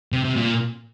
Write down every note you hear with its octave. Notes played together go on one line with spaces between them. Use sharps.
C3
C3
A#2